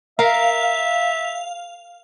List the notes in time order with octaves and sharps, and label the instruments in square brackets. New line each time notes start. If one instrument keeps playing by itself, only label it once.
[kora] A#4 [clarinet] E5 [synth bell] F5